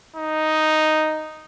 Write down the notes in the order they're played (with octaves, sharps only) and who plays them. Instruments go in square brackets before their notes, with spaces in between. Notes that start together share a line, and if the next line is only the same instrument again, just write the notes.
[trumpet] D#4